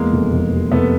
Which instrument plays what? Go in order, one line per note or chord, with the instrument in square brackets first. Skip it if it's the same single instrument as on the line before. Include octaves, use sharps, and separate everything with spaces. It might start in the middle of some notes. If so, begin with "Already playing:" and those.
Already playing: [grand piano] E2 [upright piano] G#3 A#3
[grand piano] F1
F1
C3
[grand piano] F1 [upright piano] A3 B3